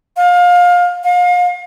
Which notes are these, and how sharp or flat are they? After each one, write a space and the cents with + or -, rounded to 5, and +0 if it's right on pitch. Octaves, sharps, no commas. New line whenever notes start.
F5 +25
F5 +35